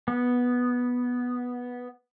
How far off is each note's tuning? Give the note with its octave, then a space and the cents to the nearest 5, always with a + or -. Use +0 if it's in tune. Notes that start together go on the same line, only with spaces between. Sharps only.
B3 -5